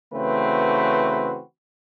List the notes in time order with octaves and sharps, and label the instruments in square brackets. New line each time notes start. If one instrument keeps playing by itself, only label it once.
[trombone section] C#3 E3 A3 C4 F#4 B4